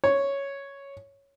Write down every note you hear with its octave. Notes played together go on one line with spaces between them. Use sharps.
C#5